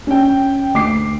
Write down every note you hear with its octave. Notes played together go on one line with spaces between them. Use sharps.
C#4 G5
D2 D6 C7